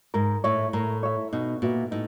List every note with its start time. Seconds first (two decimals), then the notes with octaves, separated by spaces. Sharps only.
0.14 G#2 A#4
0.44 A2 C#5 E5
0.73 A2 A#4
1.03 C#5 E5
1.33 B2 D#4
1.62 A#2 F#4 B4 E5
1.91 A2 D#4